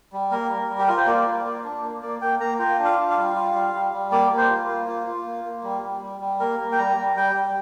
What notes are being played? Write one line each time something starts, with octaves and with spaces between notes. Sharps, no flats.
G3
A#3 A#4
G3
G3
G4
F4 A#4
C5
A#3 D5
F4
A#3
D4
A#3
A#3 D5
A#3 G5
A#3 A#5
F4 G5
D4
F5
F4
F5
G3
F4
G3
G3
G3
A#3 D5
A#3
C5
F4
A#3
F4
F4
A#3
A#3
G3
G3
G3
G3
A#3 A#4
A#3
G5
G3 A#5
G3
G3 G5
G3